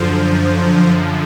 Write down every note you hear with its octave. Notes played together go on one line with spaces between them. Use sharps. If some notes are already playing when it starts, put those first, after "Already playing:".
Already playing: F#2 D3 F3 C5